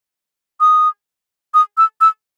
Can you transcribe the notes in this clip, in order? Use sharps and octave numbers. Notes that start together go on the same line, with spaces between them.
D#6
D#6
E6
E6